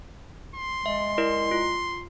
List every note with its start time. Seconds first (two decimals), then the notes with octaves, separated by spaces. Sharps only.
0.55 C6
0.86 G#3 E5
1.18 E4 A#4 D5
1.51 F4